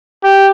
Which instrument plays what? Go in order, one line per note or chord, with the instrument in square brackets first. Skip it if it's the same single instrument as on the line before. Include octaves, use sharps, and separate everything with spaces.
[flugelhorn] G4